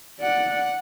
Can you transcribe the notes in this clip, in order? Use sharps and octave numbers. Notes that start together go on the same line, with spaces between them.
D5 F#5